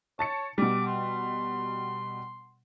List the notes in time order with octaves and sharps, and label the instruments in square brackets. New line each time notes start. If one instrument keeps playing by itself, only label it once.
[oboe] C#5 [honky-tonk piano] A5 A6 C#7
[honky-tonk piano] B2 G3 [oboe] D6
[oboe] C6